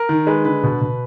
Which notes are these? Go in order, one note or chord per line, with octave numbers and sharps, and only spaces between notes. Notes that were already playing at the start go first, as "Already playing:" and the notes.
Already playing: A#4
D#3
G#3 B4
D3 B4
B2
B2